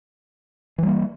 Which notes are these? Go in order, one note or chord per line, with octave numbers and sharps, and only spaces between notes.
E3 G3 A#3